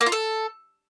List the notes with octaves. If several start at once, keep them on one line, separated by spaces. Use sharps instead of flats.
A#3
F4
A4